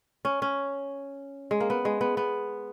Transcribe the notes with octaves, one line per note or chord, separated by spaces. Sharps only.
C#4
C#4
G#3
A#3
B3
G#3
B3
B3